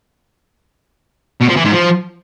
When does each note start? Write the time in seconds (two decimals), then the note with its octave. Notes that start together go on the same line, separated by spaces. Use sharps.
1.41 B2
1.49 F3
1.57 E3
1.65 G#2
1.73 F3